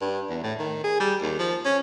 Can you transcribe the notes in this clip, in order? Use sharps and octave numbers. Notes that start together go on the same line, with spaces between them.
G2
E2
A2
D#3
G#4
G3
D#2
F3
C#4